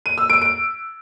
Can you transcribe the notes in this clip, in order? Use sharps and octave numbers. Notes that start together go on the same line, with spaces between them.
D#7
E6
D7
D7